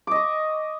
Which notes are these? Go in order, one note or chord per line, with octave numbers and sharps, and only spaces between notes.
D#5 C#6 D6